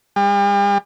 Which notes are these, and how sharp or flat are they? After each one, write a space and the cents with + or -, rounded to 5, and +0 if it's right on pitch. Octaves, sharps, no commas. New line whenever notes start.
G3 +45